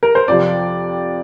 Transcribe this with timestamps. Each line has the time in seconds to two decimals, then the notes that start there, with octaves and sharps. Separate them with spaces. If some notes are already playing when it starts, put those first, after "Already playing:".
0.03 A#4
0.15 C5
0.28 F2 C3 F3 D5